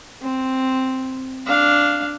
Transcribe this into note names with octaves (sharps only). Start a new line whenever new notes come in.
C4
D4 F5